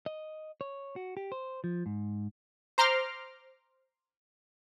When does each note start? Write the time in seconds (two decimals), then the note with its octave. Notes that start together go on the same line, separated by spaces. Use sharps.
0.06 D#5
0.61 C#5
0.96 F#4
1.17 G4
1.32 C5
1.64 F3
1.86 G#2
2.78 C5 A#5 C6 D6 F6